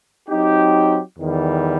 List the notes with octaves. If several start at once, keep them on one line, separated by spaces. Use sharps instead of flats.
F#3 C4 D#4 G4
E2 D#3 G3